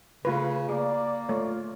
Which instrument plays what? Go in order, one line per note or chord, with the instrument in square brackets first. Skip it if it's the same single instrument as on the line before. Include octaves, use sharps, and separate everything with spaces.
[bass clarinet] C#3 [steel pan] A3 F4 B4
[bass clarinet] A#3 [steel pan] G#4 [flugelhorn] D5
[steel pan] A3 C#5 [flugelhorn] F4